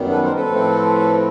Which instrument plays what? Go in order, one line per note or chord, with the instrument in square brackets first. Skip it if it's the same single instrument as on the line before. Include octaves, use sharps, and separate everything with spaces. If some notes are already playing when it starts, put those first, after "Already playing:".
Already playing: [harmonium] F#2 D#3 G3 B3
A4 B4
A#4 C5
A4 B4
A2 F3 A3 C4